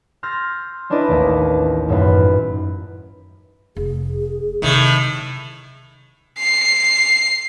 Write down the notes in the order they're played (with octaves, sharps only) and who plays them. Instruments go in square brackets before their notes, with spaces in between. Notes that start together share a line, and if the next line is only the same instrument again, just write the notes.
[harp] C6 E6 F6 G6 A6 A#6
C#4 D4 E4 B4 D5 D#5
A1 D#2
G#1 F#2 A2 F4 B4
[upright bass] F1 [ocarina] G#4
[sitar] A2 D#3 [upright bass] C3 F#3
[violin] C7